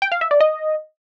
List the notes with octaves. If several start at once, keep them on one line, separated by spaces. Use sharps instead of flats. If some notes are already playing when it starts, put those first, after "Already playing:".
G5
F5
E5
D5
D#5